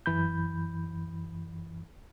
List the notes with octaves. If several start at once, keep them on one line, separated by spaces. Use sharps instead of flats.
F#2 E3 B5 G6